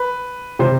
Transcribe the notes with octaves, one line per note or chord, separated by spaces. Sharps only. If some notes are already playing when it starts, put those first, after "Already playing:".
Already playing: B4
C3 C5